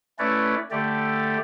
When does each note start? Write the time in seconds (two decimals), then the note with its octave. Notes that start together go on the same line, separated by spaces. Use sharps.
0.19 A3 C#4 E4 B4 C#5 D5
0.71 D3 A3 G4 D5